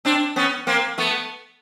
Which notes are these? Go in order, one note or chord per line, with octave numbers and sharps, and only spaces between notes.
C4 D4
B3 C#4
A#3 C4
A3 B3